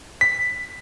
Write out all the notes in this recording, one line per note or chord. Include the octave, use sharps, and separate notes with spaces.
B6